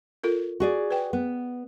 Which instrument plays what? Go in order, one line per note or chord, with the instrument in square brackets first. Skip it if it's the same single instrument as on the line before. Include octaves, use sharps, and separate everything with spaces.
[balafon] F4 A4 A#4
[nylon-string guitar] F#4 G#4 D5
[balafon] B4 G5
[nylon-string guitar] B3